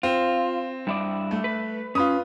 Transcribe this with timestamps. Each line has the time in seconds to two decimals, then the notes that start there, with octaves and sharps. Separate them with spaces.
0.03 C4 F4
0.87 G2 E4 D5
1.31 A3
1.44 B4
1.95 C#4 F4 B4 D#6